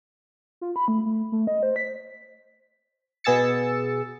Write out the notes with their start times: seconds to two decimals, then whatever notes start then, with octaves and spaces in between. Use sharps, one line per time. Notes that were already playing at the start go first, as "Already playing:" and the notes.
0.61 F4
0.76 B5
0.88 A3
1.06 A3
1.32 A3
1.47 D#5
1.63 C5
1.76 B6
3.24 B2 B3 G#4 E6 A6 C#7